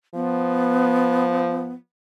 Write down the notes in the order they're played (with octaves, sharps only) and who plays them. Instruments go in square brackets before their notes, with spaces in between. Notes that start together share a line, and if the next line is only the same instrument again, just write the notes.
[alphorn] F3 [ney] B3